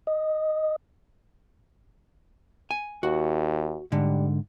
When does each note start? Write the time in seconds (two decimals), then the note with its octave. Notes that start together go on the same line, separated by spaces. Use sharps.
0.07 D#5
2.71 G#5
3.03 D#2 F#4
3.92 G#2 D3 G3